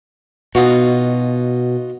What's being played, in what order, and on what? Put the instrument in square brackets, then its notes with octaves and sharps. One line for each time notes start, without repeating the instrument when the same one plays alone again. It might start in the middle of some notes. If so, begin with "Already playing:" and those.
[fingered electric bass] B2 [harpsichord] D#4 F4 F#4